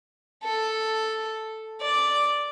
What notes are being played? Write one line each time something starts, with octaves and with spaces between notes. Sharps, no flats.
A4
D5